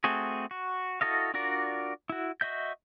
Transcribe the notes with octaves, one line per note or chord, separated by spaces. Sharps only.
A3 C4 F#4 G#4
F#4
E4 F#4 A4 D#5 F5
D4 F4 F#4 A#4 D5
E4 F#4
F#4 D#5 E5 G6